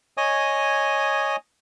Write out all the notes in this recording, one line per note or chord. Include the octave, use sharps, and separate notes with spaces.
C#5 D#5 G#5 D#6